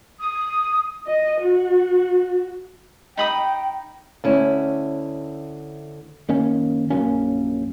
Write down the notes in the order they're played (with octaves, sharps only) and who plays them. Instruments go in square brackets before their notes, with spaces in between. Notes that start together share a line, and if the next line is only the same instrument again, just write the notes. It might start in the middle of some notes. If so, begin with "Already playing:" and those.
[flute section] D#6
[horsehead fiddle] D#5
F#4
[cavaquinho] D#4 B5 D#6 [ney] G5
[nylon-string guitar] D2 C#4 E4
[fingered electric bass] F#1 D#3 A#3 C#4
A#1 F#2 A#3 C#4